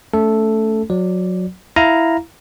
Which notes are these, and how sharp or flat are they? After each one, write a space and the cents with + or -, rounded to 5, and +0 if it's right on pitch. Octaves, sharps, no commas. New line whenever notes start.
A3 +0 C#4 +40 A4 +0
F#3 -20 D5 +0
E4 +0 F5 +0 A#5 +0